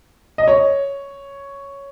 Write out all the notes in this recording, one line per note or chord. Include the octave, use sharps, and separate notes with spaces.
D#5
C#5